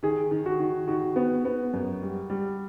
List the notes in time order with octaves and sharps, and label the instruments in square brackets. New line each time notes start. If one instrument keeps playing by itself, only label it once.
[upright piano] D#3 [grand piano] G#4
[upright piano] D#3
[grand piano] F#4
[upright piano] D#3
[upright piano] D#3 [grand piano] F#4
[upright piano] B3
B3
F#2
G3
G3